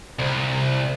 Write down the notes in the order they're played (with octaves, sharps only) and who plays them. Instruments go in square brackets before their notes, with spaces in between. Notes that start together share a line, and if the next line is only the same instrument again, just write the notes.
[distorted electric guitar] C2